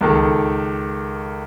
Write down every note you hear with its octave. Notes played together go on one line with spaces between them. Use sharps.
C#2 D#3 A4